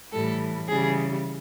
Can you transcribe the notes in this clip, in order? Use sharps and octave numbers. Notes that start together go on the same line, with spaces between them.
A2 E3 G3 A4
C#3 E3 G3 G#4